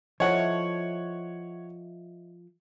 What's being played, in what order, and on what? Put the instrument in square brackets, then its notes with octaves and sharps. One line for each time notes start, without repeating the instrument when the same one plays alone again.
[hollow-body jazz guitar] F3 E4 A4 [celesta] C5 D#5 E5 [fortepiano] C#5 F#5